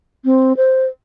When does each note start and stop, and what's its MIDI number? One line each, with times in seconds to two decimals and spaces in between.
0.25 0.53 60
0.57 0.86 72